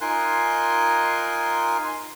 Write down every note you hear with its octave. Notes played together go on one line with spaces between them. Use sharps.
D#4 F4 A#4 G#5 C6 F#6